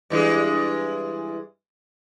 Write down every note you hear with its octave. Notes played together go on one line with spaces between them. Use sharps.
G2 E3 G#3